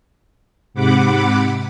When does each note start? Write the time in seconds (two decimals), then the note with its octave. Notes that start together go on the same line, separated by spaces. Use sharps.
0.74 G#2 C3 F#5 B5 D6